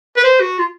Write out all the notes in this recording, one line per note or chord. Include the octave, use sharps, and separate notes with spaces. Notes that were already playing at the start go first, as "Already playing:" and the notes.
B4
C5
F#4
F4